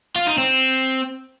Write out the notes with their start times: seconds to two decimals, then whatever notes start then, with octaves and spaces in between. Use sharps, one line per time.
0.16 F4
0.27 D#4
0.38 C4